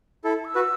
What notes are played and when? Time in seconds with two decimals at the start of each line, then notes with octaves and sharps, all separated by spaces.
0.24 E4 A4
0.28 B5
0.35 A5
0.45 E6
0.55 F#4 B4